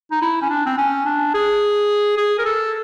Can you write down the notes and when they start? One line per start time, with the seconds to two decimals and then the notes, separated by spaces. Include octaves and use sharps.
0.12 D#4
0.22 E4
0.42 C#4
0.50 D4
0.66 C4
0.78 C#4
1.06 D4
1.34 G#4
2.17 G#4
2.39 A#4
2.45 A4